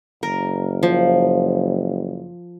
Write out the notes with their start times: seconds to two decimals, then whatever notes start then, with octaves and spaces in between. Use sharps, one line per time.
0.23 F#1 A#4
0.83 F3